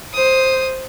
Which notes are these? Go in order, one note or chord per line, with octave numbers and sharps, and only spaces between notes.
C5 D#6